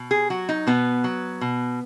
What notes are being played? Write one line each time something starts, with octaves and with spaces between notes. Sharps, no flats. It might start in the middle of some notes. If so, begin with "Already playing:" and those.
Already playing: B2
G#4
F#3 F#4
D#4
B2 B3
F#3
B2